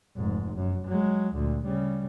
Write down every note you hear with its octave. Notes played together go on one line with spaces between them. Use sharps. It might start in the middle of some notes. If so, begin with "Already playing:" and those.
F1 G#2
F#2
F#3 G#3
D2 A#2
C#3 G3